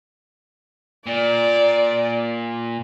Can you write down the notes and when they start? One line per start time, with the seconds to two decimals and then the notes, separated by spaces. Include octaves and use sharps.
1.06 A#2 D5